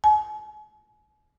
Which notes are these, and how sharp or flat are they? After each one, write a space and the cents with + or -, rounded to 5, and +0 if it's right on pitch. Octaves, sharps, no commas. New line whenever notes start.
G#5 +40